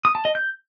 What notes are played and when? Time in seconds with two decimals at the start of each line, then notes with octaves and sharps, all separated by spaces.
0.05 D#6
0.15 A5
0.25 D#5
0.35 G6